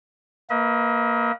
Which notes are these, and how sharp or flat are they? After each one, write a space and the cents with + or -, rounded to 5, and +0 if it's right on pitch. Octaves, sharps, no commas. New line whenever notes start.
A#3 +0 B4 +0 D#5 +45